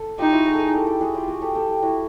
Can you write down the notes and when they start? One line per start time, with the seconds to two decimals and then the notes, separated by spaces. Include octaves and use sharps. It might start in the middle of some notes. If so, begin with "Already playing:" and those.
Already playing: A4
0.19 D#4 F4 G4
0.32 E4 F#4
0.46 F#4 G#4
0.53 A4
0.59 G#4 A#4
0.73 G4 A4
0.86 G4 A4
1.01 F#4 G#4
1.14 F4 G4
1.28 F#4 G#4
1.41 G4 A4
1.55 G4 A4
1.71 G4
1.82 E4 F#4